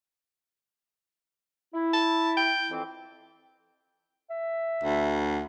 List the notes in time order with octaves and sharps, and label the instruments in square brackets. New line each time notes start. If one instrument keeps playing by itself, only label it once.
[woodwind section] E4
[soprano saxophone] A5
G5
[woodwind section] F2 E3 C4
[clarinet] E5
[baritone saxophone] D2